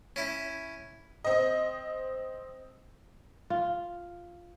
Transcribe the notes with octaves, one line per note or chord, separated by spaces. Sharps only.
C#4 E4
C4 D#5
F4